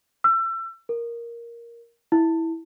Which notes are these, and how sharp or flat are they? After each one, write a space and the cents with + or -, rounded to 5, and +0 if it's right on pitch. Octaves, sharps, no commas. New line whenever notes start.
E6 +30
A#4 +5
E4 -10